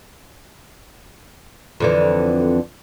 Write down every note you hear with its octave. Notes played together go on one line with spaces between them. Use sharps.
F2 D3 E3